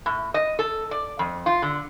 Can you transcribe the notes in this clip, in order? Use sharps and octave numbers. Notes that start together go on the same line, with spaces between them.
A2
D#5
A4
D5
F2
F4
D3